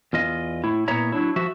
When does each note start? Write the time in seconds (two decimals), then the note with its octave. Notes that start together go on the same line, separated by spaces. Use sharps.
0.13 E2 F4 D#5
0.64 A2 E4
0.88 A#2 B3 E4 C#5 E5 A#5
1.12 F#3 D4 E4
1.36 F3 F#4 E5